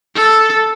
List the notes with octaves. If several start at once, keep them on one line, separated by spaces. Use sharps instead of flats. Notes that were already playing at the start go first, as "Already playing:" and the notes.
A4